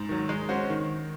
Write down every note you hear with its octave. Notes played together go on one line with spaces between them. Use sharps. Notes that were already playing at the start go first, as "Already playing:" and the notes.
Already playing: G#2
D#3 F#3
G#3
C#4 F#4 C5
D#3